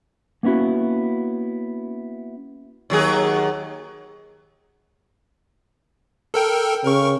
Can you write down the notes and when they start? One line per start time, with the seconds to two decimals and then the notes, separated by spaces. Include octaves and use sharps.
0.43 A#3 B3 C#4 E4 F#4
2.90 D#2 F#3 G#4
6.34 A4 A#4 G5
6.85 C#3 A#4 C#6